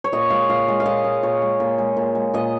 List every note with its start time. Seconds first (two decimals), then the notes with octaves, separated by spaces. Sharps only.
0.04 C#5
0.12 A#2 D#5
0.30 G#3 F5
0.49 A#2 F5
0.68 G#3
0.80 F5
0.86 A#2 D#5
1.04 G#3
1.23 A#2 C#5
1.42 G#3
1.60 A#2
1.78 G#3
1.97 A#2
2.15 G#3
2.34 A#2 D#5